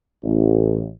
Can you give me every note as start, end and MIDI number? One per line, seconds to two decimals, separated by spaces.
0.24 0.89 33